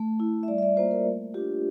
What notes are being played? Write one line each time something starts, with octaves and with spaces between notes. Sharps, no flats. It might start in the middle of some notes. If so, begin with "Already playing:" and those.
Already playing: A3
E4
E5
G3 D5
E5
D5
A#3 F4 C5
A#4
A3
D4 F4 G4